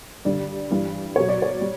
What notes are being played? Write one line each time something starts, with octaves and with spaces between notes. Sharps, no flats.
G2 D3 G3 D5
G2 E3 G3
B2 F#3 C#5
D5
C#5
G3